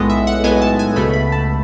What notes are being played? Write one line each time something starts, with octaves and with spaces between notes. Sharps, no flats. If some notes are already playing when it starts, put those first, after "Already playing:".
Already playing: B1 A2 G#3 B3 D#5
E5
F#5
B1 A2 G#3 B3 G#5
A5
G#5
C#2 B2 A3 B5
B5
A5